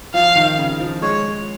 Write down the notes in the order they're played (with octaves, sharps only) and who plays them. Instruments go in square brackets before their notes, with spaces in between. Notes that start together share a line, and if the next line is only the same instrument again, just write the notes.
[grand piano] F3 [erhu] F5
[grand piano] D#3
C#3
F3
[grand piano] G#3 [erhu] C#5